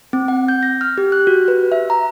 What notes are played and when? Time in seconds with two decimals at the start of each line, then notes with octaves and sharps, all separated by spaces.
0.13 C4
0.28 F#5
0.48 G6
0.63 A#6
0.81 F6
0.98 G4
1.12 F#6
1.27 F#4
1.48 B4
1.72 E5
1.90 A#5